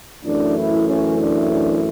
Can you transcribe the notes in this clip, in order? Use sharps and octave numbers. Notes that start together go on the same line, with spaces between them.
F#2 E3 A3 D4
E4
C#4
D4
D4